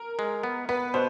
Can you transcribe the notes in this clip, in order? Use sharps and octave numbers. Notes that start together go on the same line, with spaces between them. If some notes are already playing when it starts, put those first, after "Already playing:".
Already playing: A#4
G#3
B3
B3 B4
B2 C5